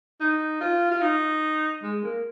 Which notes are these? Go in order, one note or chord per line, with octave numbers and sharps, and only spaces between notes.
D#4
F4
F4
D#4
G#3
A#3